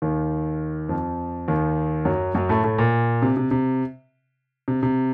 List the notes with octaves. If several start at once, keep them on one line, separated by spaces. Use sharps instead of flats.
D#2 D#3
F2 F3
D#2 D#3
F#2 F#3
F#2 F#3
A2 A3
A2 A3
A#2
C3
C3
C3
C3
C3